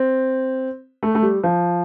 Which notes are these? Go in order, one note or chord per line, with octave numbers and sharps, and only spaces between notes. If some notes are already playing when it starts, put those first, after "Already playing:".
Already playing: C4
A3
A3
G3
F3